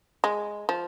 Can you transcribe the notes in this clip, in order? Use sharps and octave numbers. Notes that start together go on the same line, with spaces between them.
G#3
F3